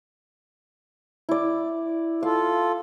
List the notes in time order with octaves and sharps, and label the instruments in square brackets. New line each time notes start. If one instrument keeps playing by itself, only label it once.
[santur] E4 D5
[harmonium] F4 A4 [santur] F5